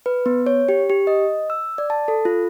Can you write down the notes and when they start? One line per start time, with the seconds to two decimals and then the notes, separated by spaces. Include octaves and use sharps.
0.06 B4
0.26 B3
0.46 C#5
0.69 G4
0.90 G4
1.07 D#5
1.50 E6
1.78 D5
1.90 A5
2.08 A4
2.25 F4